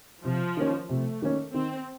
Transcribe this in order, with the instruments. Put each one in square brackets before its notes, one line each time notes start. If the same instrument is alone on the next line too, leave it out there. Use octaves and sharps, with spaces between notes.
[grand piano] C3 [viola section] F3
[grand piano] D#3 A#3 C#4
[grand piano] C3 [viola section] A3
[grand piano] D#3 A#3 C#4
[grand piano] D#3 [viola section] C4